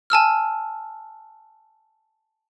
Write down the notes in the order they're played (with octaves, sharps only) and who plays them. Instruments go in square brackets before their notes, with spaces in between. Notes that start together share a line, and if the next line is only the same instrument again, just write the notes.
[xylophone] G#5 A5 E6 F6